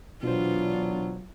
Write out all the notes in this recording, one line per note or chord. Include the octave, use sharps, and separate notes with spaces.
B2 E3 F#3 B3 D4 F4 C5